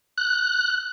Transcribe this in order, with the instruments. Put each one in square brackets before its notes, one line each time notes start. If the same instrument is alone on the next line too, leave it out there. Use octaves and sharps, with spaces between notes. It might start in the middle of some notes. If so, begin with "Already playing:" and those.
[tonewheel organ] F#6